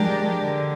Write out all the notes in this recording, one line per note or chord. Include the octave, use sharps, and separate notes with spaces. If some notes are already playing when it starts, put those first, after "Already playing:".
Already playing: F3 G#3 D4 G4 A#4
D3